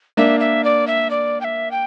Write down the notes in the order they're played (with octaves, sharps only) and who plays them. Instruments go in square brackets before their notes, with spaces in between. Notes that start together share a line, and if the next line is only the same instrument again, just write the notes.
[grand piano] A#3 D4 [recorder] E5
[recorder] E5
D5
E5
D5
G5
E5
G5